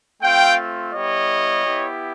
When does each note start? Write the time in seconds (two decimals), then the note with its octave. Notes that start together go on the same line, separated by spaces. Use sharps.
0.22 A3 C4 F4 F5 G5
0.93 G3 B3 E4 G4 C#5 D#5
1.64 B3 E4 G4